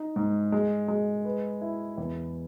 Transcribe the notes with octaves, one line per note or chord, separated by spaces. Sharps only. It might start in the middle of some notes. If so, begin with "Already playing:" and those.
Already playing: D#4
G#2
G#3
G#3
B4
E4
E2